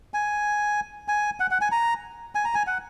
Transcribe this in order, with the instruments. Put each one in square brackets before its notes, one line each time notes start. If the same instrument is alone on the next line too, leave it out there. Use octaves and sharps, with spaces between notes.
[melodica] G#5
G#5
F#5
F#5
G#5
A#5
G#5
A#5
G#5
F#5